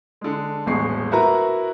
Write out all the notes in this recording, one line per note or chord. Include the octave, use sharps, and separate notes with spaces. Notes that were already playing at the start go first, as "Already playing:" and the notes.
D3 G#3
D#1 A1 E2 G#3 C#6 C7
E4 F#4 A#4 B4 A#5